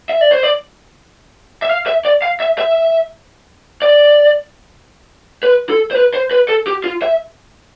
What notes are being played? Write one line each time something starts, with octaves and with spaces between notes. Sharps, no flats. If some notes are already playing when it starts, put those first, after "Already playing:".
E5
D5
C5
D5
E5
F5
E5
D5
F5
E5
E5
D5
B4
A4
C5
B4
C5
B4
A4
G4
F4
E5